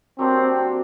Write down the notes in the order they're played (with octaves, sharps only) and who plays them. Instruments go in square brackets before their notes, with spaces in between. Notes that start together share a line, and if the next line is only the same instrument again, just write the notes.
[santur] F#3 A#3 D4 G4 [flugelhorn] C4